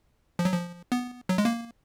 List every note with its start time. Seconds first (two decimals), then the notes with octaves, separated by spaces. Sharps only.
0.39 F3
0.45 F#3
0.52 F3
0.92 B3
1.29 F#3
1.38 G#3
1.45 A#3